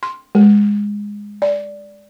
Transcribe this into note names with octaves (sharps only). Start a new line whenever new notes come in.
C6
G#3
D5